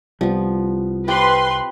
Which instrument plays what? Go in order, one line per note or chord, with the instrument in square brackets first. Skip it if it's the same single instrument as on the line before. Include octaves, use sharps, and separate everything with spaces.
[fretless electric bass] C2 G3 [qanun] F3 B3
[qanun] C4 F4 G4 [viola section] B4 C6